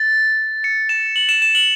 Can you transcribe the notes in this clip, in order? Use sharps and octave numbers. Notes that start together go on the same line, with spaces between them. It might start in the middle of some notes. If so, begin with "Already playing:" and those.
Already playing: A6
C#7
E7
F#7
E7
E7
F#7